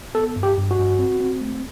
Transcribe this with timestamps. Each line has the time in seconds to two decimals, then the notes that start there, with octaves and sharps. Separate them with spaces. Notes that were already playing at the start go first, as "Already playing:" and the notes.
0.15 B3 A4
0.36 G2
0.43 G4
0.57 G2
0.71 F#4
0.79 G2
0.99 C4
1.20 C4
1.41 A3